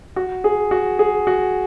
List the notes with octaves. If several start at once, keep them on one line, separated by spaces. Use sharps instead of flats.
F#4
G#4
F#4
G#4
F#4